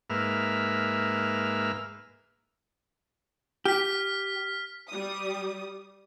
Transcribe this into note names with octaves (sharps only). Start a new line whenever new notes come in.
G#2 A#3 B4 E5 F6
G4 F6 B6
G3 D#6